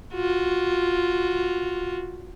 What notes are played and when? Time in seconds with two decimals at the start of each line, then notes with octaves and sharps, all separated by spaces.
0.14 F4 F#4